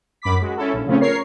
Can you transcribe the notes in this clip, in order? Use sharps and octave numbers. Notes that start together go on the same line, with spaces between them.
F#2 B5 D6 B6
G#3 F#4
C#4 E4 A4
A#1
C#3 F3 A3 C4 C#4
A#4 C#5 C7